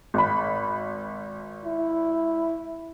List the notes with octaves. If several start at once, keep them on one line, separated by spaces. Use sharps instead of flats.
G#1 B5
E4